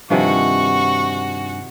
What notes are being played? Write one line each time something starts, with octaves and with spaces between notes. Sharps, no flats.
G2 C3 D#3 F3 F#4 F#5 G#5 C#6